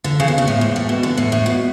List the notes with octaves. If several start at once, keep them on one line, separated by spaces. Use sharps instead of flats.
D3
C#3
B2
C#3
A2
G#2
A2
B2
D3
A2
A2
B2